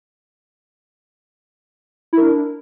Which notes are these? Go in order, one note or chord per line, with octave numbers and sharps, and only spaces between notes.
D4 E4 A#4